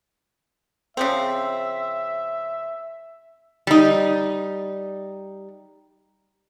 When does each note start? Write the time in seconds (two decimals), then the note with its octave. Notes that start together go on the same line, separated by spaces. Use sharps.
0.97 C#3 F3 C4 E5
3.67 G3 D#4